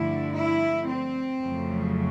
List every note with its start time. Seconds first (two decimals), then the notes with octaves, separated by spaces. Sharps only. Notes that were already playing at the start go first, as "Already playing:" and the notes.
Already playing: G2 D3 F3 A3 E4
0.36 E4
0.88 C4
1.40 F2 C#3 F#3 A3